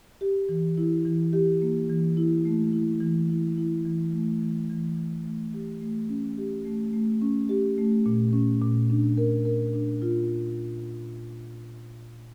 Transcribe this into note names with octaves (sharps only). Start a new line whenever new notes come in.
G4
E3
E4
E3
G4
A#3
E3
E4
A3
E4
E3
E4
E4
E3
A3
E3
E3
E3
A3
G4
A3
C#4
G4
A3
A3
C#4
G4
A3
A#2
C#4
A#2
D4
A#4
A#4
D4
F4